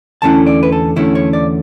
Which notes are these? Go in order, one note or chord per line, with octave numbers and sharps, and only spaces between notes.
E2 D3 A3 C#4 E4 A5
D5
B4
A4
E2 D3 A3 C#4 E4
C#5
D5